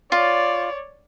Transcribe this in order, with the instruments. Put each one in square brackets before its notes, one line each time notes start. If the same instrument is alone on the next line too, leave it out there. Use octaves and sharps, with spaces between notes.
[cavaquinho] F4 [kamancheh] C#5 D5